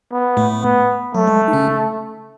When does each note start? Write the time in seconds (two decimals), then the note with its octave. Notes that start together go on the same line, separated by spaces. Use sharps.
0.12 B3
0.37 A2 A3
0.63 B3
1.14 F#3 A3
1.27 G#3
1.48 D#4
1.53 C#3 C#4